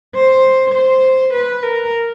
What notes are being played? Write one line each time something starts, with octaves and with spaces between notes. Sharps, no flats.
C5
C5
B4
A#4